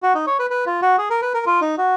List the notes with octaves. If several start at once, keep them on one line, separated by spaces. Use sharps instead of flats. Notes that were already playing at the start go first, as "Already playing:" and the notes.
F#4
D#4
C#5
B4
B4
F4
F#4
G#4
A#4
B4
A#4
F4
D#4
F#4